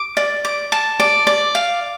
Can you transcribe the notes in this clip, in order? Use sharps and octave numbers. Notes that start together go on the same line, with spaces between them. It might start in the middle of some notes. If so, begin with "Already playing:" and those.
Already playing: D6
D5
D6
A5
D5
D5
F5